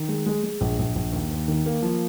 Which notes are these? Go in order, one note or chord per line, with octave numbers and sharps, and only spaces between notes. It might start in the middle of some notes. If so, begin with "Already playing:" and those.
Already playing: D#3
G#3
G#3
G#3
A#1
A#1
A#1
D#2
D#2
D#3
A#3
F3